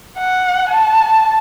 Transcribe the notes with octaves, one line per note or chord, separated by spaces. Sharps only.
F#5
A5